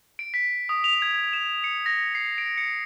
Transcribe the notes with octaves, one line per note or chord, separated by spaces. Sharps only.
D7
B6
D#6
F7
G#6
E7
C#7
A#6
C7
D7
C#7